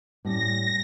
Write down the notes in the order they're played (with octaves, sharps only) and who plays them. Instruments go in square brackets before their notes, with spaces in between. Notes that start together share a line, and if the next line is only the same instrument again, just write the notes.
[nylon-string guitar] A2 G3 C#4 [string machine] A#6